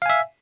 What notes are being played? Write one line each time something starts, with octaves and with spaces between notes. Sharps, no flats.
E5 F5 G#5